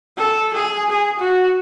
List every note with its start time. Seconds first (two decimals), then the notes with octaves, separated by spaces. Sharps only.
0.17 A4
0.54 G#4
0.90 G#4
1.20 F#4